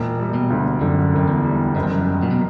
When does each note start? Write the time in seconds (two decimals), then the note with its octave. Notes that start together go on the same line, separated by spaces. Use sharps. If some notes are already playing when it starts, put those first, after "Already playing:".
Already playing: E1 A#2
0.19 G3
0.34 B2
0.50 D2
0.81 F#2 D3
1.13 E1 F#2
1.28 E2
1.44 G3
1.75 F#1 F#2
1.83 E2
1.91 F#2
2.06 F#3
2.23 A#2
2.31 B2